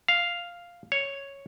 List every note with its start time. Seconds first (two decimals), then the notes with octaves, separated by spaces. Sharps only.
0.08 F5
0.92 C#5